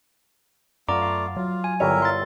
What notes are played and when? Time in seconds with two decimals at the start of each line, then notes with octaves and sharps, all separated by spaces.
0.88 F#2 A3 B3 F4 D5 A#5 D6
1.02 F5
1.36 F#3 F4
1.64 G#5
1.80 G1 G3 E4 A#4 C#5 E5
2.02 C6 A6